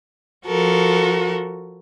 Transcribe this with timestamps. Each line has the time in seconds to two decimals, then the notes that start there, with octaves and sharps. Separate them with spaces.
0.46 F3 F#4 A4 A#4